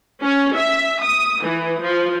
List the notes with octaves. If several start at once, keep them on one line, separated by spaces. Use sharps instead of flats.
C#4
E5
D#6
E3
F3